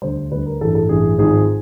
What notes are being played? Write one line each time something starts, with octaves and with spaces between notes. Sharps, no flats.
D2 D3 G3 C5
D2 D3 G3 B4
A#4
A1 G2 E3 A4
A4
A1 G2 E3 G#4
G#1 G#2 F3 G#4